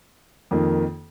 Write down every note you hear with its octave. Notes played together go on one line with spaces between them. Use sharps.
F2 D#3 A#3